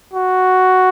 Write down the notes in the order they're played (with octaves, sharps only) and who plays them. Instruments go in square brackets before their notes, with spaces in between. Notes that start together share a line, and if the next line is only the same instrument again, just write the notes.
[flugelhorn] F#4